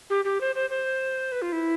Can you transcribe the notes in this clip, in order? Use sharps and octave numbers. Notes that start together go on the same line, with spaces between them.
G4
G4
C5
C5
C5
B4
F4
E4